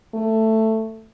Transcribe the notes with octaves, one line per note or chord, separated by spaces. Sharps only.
A3